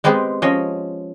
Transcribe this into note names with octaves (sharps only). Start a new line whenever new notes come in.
G#3 B3 C4 G4 G#4
F3 C#4 D#5